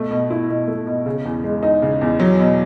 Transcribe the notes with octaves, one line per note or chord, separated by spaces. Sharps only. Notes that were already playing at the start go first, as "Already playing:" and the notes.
Already playing: B2 A3
B2
E4
B2
A3
B2
C#3
E2
G#3
D#4
C#3
E2
F#3
B2